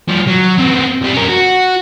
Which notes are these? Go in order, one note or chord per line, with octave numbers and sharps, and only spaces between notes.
F3 G3
F#3
B3 C4
C2 G3
C#4 A#4
F#4